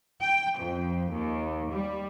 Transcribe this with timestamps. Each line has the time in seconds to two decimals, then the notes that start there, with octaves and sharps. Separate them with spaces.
0.22 G5
0.58 F2
1.12 D#2
1.71 G3